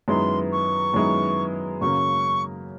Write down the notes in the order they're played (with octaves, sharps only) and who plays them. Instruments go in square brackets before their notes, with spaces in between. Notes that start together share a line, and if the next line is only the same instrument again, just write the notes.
[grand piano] F#2 D#3 G#3 B3 E4 [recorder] C6
[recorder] C#6
[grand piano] F#2 D#3 G#3 B3 E4
[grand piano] F#2 C#3 F#3 A#3 [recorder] C#6